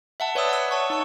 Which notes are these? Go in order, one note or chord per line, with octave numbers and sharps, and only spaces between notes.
E5 F#5 A5
B4 C#5 D5 E5 D#6 E6
F#5 E6
C#5 A5 C#6
D#4 A5 C#6